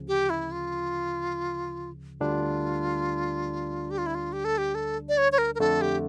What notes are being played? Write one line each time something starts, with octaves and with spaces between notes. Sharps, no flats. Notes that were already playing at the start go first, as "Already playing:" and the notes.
Already playing: D2 C#3 F3
G4
E4
F4
D2 D3 G3 D4 F4
G4
F4
E4
F4
G4
A4
G4
A4
D5
C#5
C#5
A#4
A#4
F2 D3 A3 A4
G4